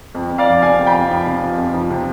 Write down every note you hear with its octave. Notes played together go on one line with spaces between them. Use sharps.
F2
F2
D5 F5
F3
C3 F5 G#5
F2
G5 B5
F2
F3
C3
F2
F2
F3
C3